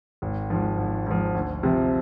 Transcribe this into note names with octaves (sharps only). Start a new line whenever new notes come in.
G#1
G#2 F3
G#1
G#2 F3
D2
C3 F3